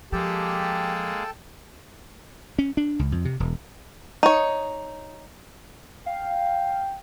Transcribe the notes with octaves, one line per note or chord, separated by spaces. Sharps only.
F3 G#3 A#3 G4 A4 G5 A5
C#4
D4
C#2
F2
C3
E1
D#4 C#5
F5 G5